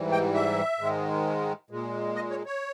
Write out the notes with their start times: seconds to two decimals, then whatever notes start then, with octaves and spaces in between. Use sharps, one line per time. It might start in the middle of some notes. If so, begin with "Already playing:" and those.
Already playing: G#2 E3 G3
0.12 G5
0.34 E5
0.79 G#2 D#3 G#3
1.70 A#2 G#3
2.15 D#5
2.30 C#5
2.46 C#5